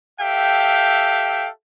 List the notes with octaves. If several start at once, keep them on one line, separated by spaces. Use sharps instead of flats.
G4 A4 E5 F5 G5